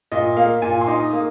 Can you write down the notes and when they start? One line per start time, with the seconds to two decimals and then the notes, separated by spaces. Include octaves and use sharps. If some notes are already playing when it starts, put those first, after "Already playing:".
0.12 A#2 D#5
0.37 A#3 F5
0.62 A#2 G#5
0.81 C6
0.87 D#4
1.00 D#6
1.13 A#3 D#6